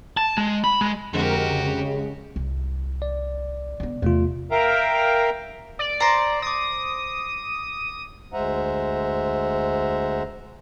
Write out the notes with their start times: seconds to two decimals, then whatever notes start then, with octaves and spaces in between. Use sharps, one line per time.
0.17 A5
0.37 G#3
0.64 B5
0.81 G#3
1.13 F2 D3 G#3 C4 F#4 G4 A#4
1.46 C#3
2.36 C2
3.02 D5
3.80 D3 B3
4.02 E2 C3 A3 F4
4.51 A#4 E5 F5 G5 A#5
5.79 D5
6.00 C5 A#5 A#6 C7 D7
6.42 D6 D#6 A#6
8.33 D2 G#3 C5 E5 F#5 A#5